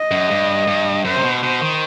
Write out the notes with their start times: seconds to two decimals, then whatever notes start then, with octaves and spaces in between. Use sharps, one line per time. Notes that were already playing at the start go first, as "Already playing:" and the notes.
Already playing: D#5
0.11 F#2
0.31 G2
0.67 G2
1.05 F#2 C5
1.16 C3
1.23 B2
1.42 B2 C5
1.61 D#3